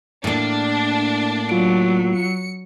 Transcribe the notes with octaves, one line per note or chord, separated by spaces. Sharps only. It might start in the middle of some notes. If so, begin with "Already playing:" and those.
A2 A#3 D4
F#3 F4 D7
C#7